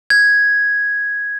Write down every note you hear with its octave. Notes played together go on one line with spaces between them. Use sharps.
G#6